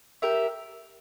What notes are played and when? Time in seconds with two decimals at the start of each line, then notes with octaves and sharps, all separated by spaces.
0.22 G4 A#4 E5